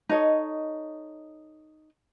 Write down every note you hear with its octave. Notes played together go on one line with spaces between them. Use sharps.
D#4 A4 C#5 D#5